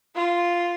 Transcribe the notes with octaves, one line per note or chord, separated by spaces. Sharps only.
F4